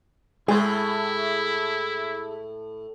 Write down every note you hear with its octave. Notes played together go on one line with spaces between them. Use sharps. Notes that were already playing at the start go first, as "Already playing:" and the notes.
A2 G#3 E4 G#4 G#5 C6